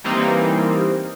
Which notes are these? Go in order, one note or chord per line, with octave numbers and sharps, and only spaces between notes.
E3 G3 A#3 C4 D#4